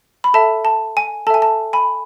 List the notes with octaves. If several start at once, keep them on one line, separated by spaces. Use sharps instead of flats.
B5
A4 E5 A5
A5
G#5
A4 E5 G#5 A5
A5
G#5 B5